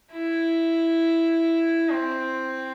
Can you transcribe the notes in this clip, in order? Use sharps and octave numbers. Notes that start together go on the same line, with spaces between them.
E4
C4